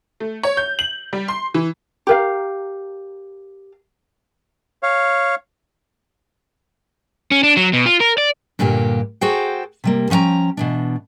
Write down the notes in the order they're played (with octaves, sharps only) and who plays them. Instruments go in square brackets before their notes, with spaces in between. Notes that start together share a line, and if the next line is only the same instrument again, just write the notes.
[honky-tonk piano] A3
C#5
G6
F#7
G3
C6
E3
[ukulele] G4 A#4 F5
[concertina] C#5 F5
[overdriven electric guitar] C#4
D4
F#3
B2
F4
A#4
D5
[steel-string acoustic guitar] G2 A#2 D3 A#3 G4
F#4 G#4 A4 C5 G5
C3 G3 A#3
F3 C#4 F#5 G5 A#5
B2 E3 D4